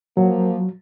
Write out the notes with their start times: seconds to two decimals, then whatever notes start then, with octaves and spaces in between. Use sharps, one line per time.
0.17 F3 F#3 A#3